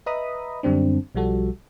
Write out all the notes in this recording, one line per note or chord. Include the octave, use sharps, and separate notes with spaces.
B4 D#5 E5 A#5 B5 D#6
F#2 D3 G3 C4 D4
B1 F3 G3 F#4 A4